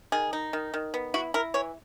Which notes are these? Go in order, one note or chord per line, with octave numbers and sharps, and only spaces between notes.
D#3 G#4
D#4
D#3
D#3
B3
E4 F#4
E4 A#4
E3 C#5